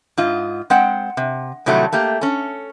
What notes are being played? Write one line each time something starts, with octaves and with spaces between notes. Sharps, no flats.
G#2 F4 D#5
G#3 C4 F#5 G5
C3
A2 C3 D#3 F#3 G3 A3
A3 A#3 G4
C#4 A4